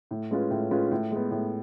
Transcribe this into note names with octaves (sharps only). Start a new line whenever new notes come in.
A2
G#3 C#4 F4 B4
A2
G#3 C#4 F4 B4
A2
G#3 B3
A2